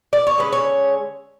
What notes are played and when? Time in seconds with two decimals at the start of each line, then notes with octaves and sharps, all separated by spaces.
0.13 D5
0.27 C#5
0.38 D3 G#3 C#4 B4
0.53 C#5